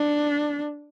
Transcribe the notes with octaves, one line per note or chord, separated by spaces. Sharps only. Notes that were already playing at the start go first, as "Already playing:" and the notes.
Already playing: D4